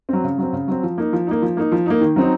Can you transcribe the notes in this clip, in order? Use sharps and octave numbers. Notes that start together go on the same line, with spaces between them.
F#3 C4
C#3
F#3 C4
C#3
F#3 C4
F3
A#3 D#4
F3
A#3 D#4
F3
A#3 D#4
F3
A#3 D#4
D#3
F#3 C4 D#4